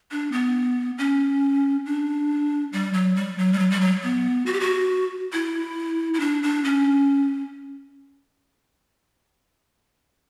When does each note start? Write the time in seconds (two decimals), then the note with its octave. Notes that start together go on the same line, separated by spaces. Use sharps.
0.11 D4
0.32 B3
0.98 C#4
1.86 D4
2.73 G3
2.93 F#3
3.16 G3
3.38 F#3
3.53 G3
3.59 F#3
3.71 G3
3.81 F#3
4.03 B3
4.46 F#4
4.54 G4
4.60 F#4
5.33 E4
6.14 E4
6.20 D4
6.43 D4
6.64 C#4